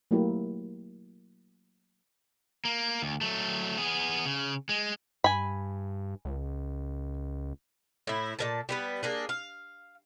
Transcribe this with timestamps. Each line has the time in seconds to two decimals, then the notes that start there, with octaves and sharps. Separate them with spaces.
0.11 F#3 A3 A#3 E4 G4
2.65 A#3
3.02 D2
3.21 F#3 A3
3.77 B3 G#4
4.26 C#3
4.69 G#3
5.24 G2 G#5 B5
6.25 C#2
8.07 A2 E4
8.39 A#2 A#3 A5
8.69 G3 B3 B4
9.03 A#3 D4 G#4
9.29 F5